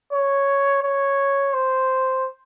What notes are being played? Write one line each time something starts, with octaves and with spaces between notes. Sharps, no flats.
C#5
C#5
C5